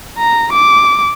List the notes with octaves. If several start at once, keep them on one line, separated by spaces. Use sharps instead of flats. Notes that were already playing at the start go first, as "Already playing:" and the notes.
A#5
D6